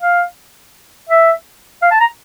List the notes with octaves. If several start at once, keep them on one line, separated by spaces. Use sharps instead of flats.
F5
E5
F5
A5
A#5